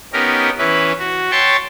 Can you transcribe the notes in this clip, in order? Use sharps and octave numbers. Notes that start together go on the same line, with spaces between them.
B3 C#4 D#4 G4 A#4
E3 C#4 E4 B4
F#4
C#5 E5 G5 A5 C6 C#6